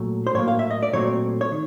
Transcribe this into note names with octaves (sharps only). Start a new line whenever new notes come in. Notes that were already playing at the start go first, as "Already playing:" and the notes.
Already playing: A#2 F#3 A3
C5
A2 F#3 A#3 C#5
F5
E5
D#5
D5
A#2 F#3 A3 C4 C#5
C#5
D#3